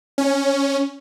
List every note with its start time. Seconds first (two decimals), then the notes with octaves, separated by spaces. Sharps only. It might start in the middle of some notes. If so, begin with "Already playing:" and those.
0.18 C#4